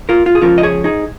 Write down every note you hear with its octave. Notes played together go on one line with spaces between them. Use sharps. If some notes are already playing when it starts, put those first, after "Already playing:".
F4 A#4
F4
G#4
C#2 C#3 F3 C#4 F4 A#4
D#5
G#4 C#5
D#4 G#4